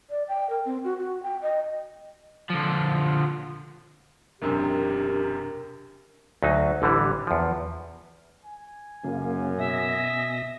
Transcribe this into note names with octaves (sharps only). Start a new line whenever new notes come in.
D5
G5
A#4
C4
F#4
F#4
G5
D#5
D3 F3
E1 F#2 C3 D4 G4 A#4
D2 F#3 D#4
A1 D3 E3 G3
E2 F3
G#5
F#2 C#3 A#3
B2 D#5 E5 A#6